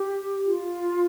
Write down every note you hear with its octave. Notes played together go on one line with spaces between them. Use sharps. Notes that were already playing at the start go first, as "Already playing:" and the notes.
Already playing: G4
F4